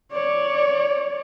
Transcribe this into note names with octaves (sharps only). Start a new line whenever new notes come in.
C#5 D5